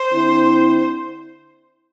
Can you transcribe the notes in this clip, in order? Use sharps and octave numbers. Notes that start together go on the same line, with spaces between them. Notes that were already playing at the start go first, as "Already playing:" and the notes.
Already playing: C5
D3 C4 E4